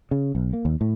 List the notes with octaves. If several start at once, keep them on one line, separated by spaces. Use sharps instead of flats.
C#3
B1
A#3
D#2
A2